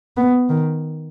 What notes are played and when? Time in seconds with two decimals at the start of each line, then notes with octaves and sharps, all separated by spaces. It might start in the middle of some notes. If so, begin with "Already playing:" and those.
0.17 B3
0.49 D#3